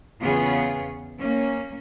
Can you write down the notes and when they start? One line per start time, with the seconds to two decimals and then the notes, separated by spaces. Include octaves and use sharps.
0.21 E2 C#3 B3 F4 G#4 C#5
1.18 A#3 C#4